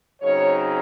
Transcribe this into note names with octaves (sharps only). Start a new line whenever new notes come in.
C#3 F#3 C4 D#4 C#5